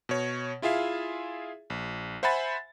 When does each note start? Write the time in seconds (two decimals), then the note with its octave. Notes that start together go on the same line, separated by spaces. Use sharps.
0.09 B2 C#5
0.62 E4 F4 G#4 E5 F5
1.70 A#1
2.23 C5 E5 F#5 G#5 B5 A6